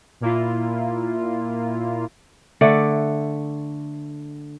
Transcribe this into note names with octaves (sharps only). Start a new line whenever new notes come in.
A#2 A#3 E4 F4
D3 A3 D5